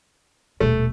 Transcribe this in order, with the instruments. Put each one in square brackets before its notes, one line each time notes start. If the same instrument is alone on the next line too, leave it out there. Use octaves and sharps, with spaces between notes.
[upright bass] D#1 B2 [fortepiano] A3